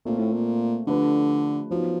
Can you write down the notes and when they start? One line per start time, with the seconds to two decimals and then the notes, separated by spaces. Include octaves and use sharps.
0.05 A#2 A3 C4 F4
0.19 A2
0.33 A#2
0.87 D3 F3 A3 D4 G4 B4
1.70 F3 F#3 B3 D#4